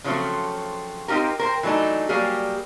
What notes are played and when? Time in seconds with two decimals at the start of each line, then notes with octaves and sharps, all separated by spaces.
0.04 C#3 F3 F#3 A3 C4
1.08 C4 D#4 F4 G4 A#4
1.39 A#4 C5 G5
1.63 E3 F#3 A3 D4 D#4
2.09 F#3 G3 A#3 G4 G#4